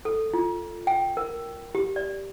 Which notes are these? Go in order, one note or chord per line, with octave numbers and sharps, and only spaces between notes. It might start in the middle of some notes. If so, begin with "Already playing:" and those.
A4
F4
G5
A#4
G4
D5